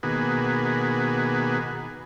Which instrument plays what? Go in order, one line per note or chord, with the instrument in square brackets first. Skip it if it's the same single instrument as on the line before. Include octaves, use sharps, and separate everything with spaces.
[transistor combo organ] B2 D#3 A#3 B3 F#4 G#4